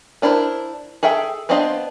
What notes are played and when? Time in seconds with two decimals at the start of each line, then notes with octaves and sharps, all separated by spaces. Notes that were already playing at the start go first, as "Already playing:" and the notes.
0.22 B3 D4 E4 A#4 C5
1.03 G#4 A4 E5 G5
1.49 B3 C4 D4 D#5 F5